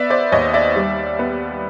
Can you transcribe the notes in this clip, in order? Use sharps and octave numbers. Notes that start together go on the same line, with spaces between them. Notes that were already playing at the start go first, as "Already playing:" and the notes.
Already playing: B3 D5 E5
C5 D5
D#2 C#5 D#5
D5 E5
G3
B3